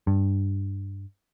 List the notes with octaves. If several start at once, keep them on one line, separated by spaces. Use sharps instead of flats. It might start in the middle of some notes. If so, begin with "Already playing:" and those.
G2